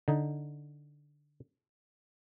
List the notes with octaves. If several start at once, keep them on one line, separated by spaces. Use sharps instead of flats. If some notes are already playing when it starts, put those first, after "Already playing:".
D3 D#4